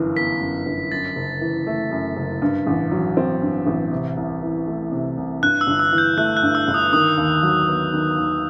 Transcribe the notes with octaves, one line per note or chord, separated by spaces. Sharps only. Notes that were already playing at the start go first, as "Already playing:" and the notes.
Already playing: G1 F#2 E3
B3 B6
F#2
G1
F#2 A6
F#1
E3
A3
F#2
F#1
G2
A1
F#3
C4
G2
A1
C3
C2
E3
A3
C3
C2
G2 F#6
E6
G1
E6
E3
G6
A3 F#6
F#6
G2
E6
G1
D#6
D#3 D#6
D#2
F#3
B3
D#3
D#2